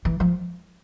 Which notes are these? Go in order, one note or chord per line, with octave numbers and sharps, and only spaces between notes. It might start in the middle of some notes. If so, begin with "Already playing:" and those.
E3
F3